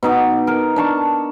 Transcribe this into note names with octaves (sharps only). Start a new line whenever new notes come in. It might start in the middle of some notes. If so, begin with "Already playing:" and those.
B2 D#4 D6
A#4
D4 A5 C#6